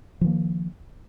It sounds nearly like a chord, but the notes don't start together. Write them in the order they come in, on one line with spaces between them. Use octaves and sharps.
F3 D#3 A#3